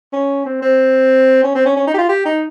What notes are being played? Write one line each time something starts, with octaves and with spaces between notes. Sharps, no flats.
C#4
C4
C4
C#4
C4
C#4
C#4
D#4
G4
F4
G4
D#4